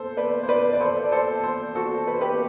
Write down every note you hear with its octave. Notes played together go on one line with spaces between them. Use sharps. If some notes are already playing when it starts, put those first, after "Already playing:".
Already playing: A4 C5
B4 D5
C5
B4 D5
D5
A4 C5
D5
A4 C5
A4 C5
F#4 A4
B4
C5
G4 B4